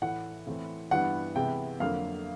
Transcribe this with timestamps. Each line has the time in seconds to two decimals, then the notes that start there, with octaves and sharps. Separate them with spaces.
0.02 A2 E3 A3 F#5
0.47 A2 E3 A3 C4
0.91 G2 E3 G3 B3 F#5
1.36 C3 E3 G#3 B3 G5
1.80 F2 D3 F#3 A#3 F5